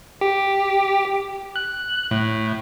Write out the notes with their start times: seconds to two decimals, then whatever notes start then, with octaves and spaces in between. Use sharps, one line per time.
0.21 G4
1.56 F#6
2.11 A2